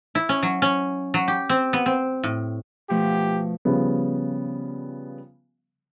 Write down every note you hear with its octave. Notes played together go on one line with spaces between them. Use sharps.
E4
C#4
F#3
C#4
F#3
G4
C4
B3
C4
A2
B2 F3 A3 G4
C#3 F3 G3 B3